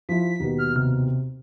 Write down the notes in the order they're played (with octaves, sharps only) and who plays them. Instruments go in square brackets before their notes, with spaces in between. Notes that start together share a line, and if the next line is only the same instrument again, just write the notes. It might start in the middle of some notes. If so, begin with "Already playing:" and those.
[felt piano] F3 E4 [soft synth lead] B6
[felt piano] D#2 B2
[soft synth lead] F6
C3